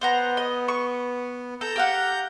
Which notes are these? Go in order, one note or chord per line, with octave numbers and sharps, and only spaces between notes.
B3 C5 F#5 A#5
D#5
C#6
A4 A#5 G6
G4 F5 F#5